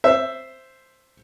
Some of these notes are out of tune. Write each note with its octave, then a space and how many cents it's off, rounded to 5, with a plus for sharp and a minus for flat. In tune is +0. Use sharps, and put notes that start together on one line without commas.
C5 +0 E5 +10